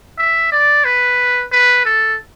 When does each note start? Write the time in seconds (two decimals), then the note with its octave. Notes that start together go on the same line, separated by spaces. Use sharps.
0.18 E5
0.52 D5
0.85 B4
1.52 B4
1.85 A4